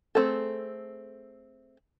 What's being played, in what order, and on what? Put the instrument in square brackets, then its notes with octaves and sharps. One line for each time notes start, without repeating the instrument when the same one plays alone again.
[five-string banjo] A3 A#3 C4 G#4 A4